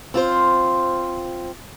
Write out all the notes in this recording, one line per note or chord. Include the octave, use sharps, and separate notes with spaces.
C4 F4 C5